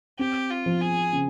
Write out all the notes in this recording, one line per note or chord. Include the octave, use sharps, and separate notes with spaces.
C4 G4
F4
F3
G#4
C#3